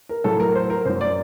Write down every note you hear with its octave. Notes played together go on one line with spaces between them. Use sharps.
A#4
A2 F#3 A4
A#4
C5
A#4
F#2 F#3 C5
D5